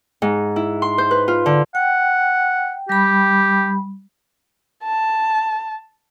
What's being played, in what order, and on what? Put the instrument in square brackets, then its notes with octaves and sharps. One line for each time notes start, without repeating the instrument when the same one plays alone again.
[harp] G#2
E4
C6
C5
B4
F4
D3
[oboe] F#5 [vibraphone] G5
[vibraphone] G3 B5 [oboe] G4
[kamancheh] A5